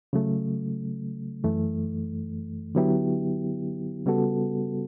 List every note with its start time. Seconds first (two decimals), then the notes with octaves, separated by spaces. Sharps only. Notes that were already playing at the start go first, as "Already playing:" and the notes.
0.13 C#3 F#3 A3
1.44 F#2 E3 A3
2.75 D3 F#3 B3 E4 G4
4.06 C#3 G3 B3 F#4 A4